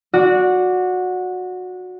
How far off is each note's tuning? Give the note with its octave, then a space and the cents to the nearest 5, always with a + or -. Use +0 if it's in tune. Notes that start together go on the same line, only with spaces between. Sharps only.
F#4 -20 D5 -15